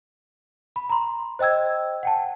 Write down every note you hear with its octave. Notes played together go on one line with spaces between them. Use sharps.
B5
A#5 C6
C5 D#5 G5 E6 G#6
F#5 G5 A5